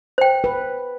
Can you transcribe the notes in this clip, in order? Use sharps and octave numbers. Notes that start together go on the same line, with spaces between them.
C5 G5
B4